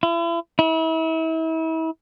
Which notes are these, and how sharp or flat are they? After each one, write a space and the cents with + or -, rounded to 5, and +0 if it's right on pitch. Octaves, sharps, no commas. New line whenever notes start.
E4 +40
E4 -35